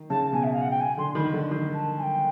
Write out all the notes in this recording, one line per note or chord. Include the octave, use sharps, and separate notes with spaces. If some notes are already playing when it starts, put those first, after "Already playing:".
Already playing: D#3
C#3 A5
B2 G#5
E5
F5
F#5
G5
G#5
D3 C6
D#3 B5
D3
D#3
A5
G#5
G5